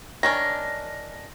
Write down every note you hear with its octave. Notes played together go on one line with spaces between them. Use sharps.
D#3 C#4 D4 A#6